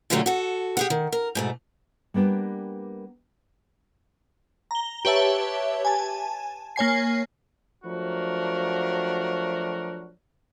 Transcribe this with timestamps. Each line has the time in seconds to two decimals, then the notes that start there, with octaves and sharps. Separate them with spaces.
0.10 A#2 D3 F3 F#3 A3 G4
0.26 F#4 A4
0.77 G4 G#4 F#5
0.90 D#3
1.12 A#4
1.35 G#2 B2 A3
2.14 G3 A#3 B3 D4 G4
4.71 A#5 G7
5.05 G4 B4 C#5 E5 A5
5.85 G#5 A5
6.76 A#3 C#5 G#5 C7
7.85 F3 F#3 A3 D4 F#4 A#4